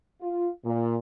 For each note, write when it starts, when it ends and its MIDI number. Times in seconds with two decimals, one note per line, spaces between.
0.21 0.49 65
0.65 0.96 46